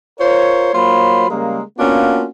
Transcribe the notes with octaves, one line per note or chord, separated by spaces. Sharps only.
F4 A#4 C5 C#5
F#3 A#3 F4 C5 C#5 B5
C#3 G3 G#3 A#3
A#3 B3 C#4 D4 F4 F#4